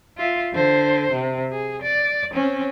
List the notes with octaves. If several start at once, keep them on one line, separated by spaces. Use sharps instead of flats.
F4 E5
D3 C5
C3
G#4
D5
C4 C#4